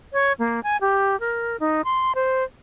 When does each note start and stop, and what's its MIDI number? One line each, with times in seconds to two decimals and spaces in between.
0.13 0.33 73
0.39 0.63 58
0.63 0.77 80
0.81 1.19 67
1.20 1.57 70
1.60 1.82 63
1.84 2.12 84
2.15 2.43 72